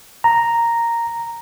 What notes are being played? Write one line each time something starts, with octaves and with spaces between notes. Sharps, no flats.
A#5